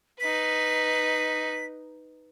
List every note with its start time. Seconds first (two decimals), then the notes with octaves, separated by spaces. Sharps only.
0.20 D#4 B4 B6